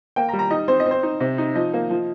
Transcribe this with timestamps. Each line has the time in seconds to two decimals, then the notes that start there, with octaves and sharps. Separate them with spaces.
0.16 A#3 G5
0.29 A#5
0.33 G3
0.39 A#5
0.51 D#4 D#5
0.68 C4 C5
0.80 D#5
0.86 C4 C5
1.03 D#4
1.20 C3
1.38 D#4
1.55 F3 D#5
1.74 A#3
1.90 F3